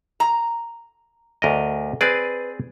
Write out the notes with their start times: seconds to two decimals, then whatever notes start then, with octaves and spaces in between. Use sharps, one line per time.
0.20 A#5
1.42 D2 A#4 D#5
2.01 C4 G#4 B4 D5